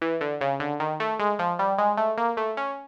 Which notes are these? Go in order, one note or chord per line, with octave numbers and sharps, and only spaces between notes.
E3
D3
C#3
D3
D#3
A3
G#3
F3
G3
G#3
A3
A#3
A3
C#4